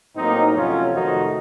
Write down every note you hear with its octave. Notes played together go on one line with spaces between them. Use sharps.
A2 F#3 A#3 C4 D#4
F2 C3 F#3 A3 C#4 F4
F2 C3 D#3 A3 D#4 F#4